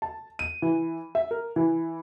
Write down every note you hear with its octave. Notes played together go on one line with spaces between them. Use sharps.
A5
D#7
E3
E5
A#4
E3